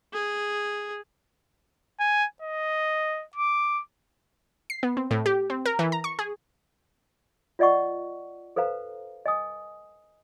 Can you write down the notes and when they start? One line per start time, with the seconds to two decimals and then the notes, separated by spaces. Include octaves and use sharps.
0.13 G#4
2.00 G#5
2.42 D#5
3.35 D6
4.70 C7
4.83 B3
4.97 C4
5.11 A2
5.26 G4
5.50 C4
5.66 A#4
5.79 E3
5.92 A#5
6.04 C#6
6.19 G#4
7.59 F4 D5 D#5 F#5 C#6
8.56 A4 B4 C5 F5 A#5
9.26 D#5 G#5 D#6